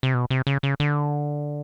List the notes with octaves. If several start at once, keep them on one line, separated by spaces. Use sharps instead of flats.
C3
B2
C3
C#3
C#3
D3